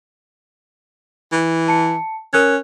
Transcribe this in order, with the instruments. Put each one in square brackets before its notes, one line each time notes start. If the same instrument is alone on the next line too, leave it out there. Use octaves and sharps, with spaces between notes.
[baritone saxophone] E3
[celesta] A5 C#7
[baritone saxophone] C#4 [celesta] A#4 F#6 G#6